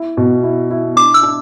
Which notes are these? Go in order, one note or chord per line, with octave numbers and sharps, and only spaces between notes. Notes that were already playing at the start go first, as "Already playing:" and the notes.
Already playing: E4
B2
E4
E4
D4 D6
E6
D4